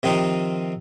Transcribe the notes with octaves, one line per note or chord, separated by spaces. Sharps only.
C3 D#3 F3 C4 D#4